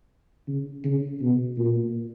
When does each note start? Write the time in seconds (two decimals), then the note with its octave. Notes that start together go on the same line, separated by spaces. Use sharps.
0.48 C#3
0.84 C#3
1.21 B2
1.58 A#2